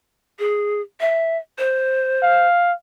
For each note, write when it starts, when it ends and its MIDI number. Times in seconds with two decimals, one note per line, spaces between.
0.39 0.81 68
1.01 1.37 76
1.58 2.47 72
2.22 2.73 77